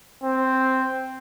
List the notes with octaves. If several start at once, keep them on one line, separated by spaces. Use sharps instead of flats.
C4